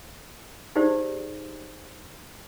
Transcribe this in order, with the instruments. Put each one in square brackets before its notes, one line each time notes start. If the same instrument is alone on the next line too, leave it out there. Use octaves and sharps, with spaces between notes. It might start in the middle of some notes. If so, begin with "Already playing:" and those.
[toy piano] D#4 G4 G#4 C5 D5